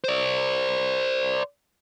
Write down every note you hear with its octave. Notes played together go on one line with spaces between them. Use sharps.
C5 D5